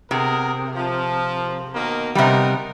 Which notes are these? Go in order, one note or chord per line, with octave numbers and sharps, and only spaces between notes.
C3 B3 G#4 A#4
F3
B2 D#3 A#3
C3 G3 B3 D#4 A#4